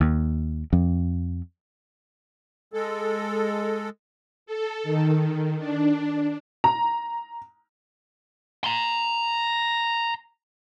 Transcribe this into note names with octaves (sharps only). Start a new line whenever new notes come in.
D#2
F2
G#3 A4
A4
D#3
D4
A#5
A#5 C6